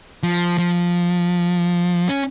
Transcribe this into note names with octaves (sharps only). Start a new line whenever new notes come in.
F3
F3
C#4